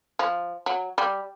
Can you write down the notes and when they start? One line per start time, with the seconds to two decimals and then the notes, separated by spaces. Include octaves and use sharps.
0.19 F3
0.66 F#3
0.98 G3